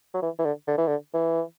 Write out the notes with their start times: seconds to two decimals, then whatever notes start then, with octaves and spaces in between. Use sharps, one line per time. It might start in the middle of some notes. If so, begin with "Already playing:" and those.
0.14 F#3
0.22 E3
0.39 E3
0.45 D3
0.67 D3
0.78 E3
0.87 D3
1.14 E3